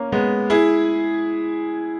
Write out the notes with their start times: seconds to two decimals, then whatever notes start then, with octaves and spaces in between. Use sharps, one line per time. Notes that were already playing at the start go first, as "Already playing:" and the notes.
Already playing: A#3 C#4
0.12 G#3 B3
0.50 E4 G#4